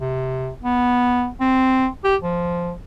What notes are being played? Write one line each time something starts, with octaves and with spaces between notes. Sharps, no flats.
C3
B3
C4
G4
F3